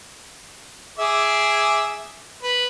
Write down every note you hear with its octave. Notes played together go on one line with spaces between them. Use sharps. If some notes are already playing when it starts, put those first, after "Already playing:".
G#4 E5 D6
B4